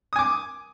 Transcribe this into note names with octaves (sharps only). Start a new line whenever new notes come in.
G#5 D6 D#6